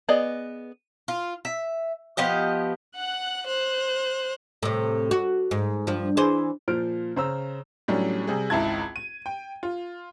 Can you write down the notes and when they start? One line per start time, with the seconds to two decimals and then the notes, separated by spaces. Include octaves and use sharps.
0.09 B3 G#4 D5 D#5
1.08 F4
1.45 E5
2.17 F3 B3 G4 D#5
2.95 F#5 F#6
3.47 C5 F#6
4.63 A2 C3
5.11 F#4
5.51 G#2
5.87 G2 F3
6.17 E3 G#4 C5
6.68 A#2 F3 C5 F6 D7
7.17 C#3 C5 A#5 E6
7.88 A2 F#3 G3 C#4 D4
8.27 C3 G3 G#4
8.50 G#1 C#2 E4 A5 G#6
8.96 D#7
9.26 G5
9.63 F4